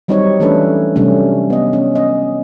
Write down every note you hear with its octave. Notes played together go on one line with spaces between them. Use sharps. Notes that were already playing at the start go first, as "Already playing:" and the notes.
F#3 G3 C4 D#4 G4 C#5
E3 A3 C#4 D4 A4 B4
C3 F#3 G3 A3 C#4 D4
B3 D#5
C#4
D#5